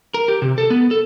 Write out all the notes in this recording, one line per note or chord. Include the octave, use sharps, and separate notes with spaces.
A#4
G4
C3
A4
B3
A4